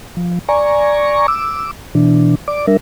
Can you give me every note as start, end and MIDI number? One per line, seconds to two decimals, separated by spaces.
0.17 0.39 53
0.49 1.27 74
0.49 1.27 80
0.49 1.27 82
0.49 1.27 85
1.28 1.71 86
1.28 1.71 88
1.95 2.35 47
1.95 2.35 52
1.95 2.35 62
2.48 2.66 74
2.48 2.66 86
2.67 2.77 55
2.67 2.77 62
2.67 2.77 70
2.67 2.77 76